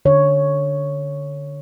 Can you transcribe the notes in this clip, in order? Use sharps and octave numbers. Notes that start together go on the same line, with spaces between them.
D3 C#5